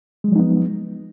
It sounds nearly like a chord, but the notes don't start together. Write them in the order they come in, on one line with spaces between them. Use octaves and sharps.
G#3 F#3 F3 D#4 B3